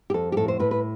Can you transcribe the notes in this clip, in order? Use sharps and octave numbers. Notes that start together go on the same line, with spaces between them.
G4
F2 A4
G4
A2 A4
C5
A2 B4
B4